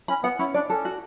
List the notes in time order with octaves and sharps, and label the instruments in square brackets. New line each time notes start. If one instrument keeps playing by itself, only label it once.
[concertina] C#4 [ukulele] B5
[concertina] B3 [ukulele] F#5
[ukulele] C#4 [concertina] E4
[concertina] D4 [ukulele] D5
[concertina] C#4 [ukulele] A4
[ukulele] F#4